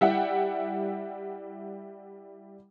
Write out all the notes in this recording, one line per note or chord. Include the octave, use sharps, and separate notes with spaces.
G3 E4 E5 F#5 G5